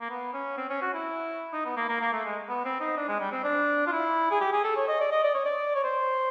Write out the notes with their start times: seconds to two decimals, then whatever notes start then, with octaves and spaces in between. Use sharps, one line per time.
0.01 A#3
0.10 B3
0.33 C#4
0.57 C4
0.69 C#4
0.82 F#4
0.94 E4
1.53 D#4
1.65 B3
1.77 A#3
1.89 A#3
2.01 A#3
2.12 A3
2.25 G#3
2.49 B3
2.65 C4
2.80 D#4
2.97 D4
3.08 G#3
3.20 G3
3.32 C4
3.44 D4
3.87 F4
3.92 E4
4.31 G#4
4.41 G4
4.52 G#4
4.64 A4
4.76 C#5
4.88 D#5
5.00 D5
5.12 D#5
5.23 D5
5.35 C#5
5.45 D5
5.75 C#5
5.84 C5